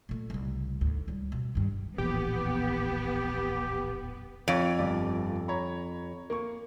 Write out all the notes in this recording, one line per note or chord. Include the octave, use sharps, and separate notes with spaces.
A#2 A3
C2 C#3
D2 G#2
C#2 G3
B2
G2 D#3
D1 A#1 E2 B3 G4
F2 C#5
G1 D5
C#5 A#5 B5
A#3 C#6